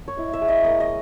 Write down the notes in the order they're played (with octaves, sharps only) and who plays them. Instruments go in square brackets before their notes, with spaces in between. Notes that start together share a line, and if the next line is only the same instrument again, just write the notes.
[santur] C#5
E4 D#5
E5
G#3
D#5
A#3 D#5
D#5